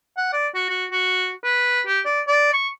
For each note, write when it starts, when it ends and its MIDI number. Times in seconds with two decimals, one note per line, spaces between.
0.17 0.28 78
0.33 0.48 74
0.54 0.66 66
0.69 0.85 66
0.92 1.32 66
1.44 1.81 71
1.87 2.00 67
2.06 2.21 74
2.27 2.53 74
2.53 2.68 85